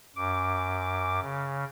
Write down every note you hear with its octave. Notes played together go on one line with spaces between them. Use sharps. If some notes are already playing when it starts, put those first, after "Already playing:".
F#2 D6
C#3